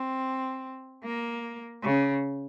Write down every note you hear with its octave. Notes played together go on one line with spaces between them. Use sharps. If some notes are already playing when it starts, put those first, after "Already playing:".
Already playing: C4
A#3
C#3